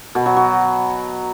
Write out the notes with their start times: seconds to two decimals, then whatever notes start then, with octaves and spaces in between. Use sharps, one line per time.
0.15 B2
0.26 F#3
0.36 F#3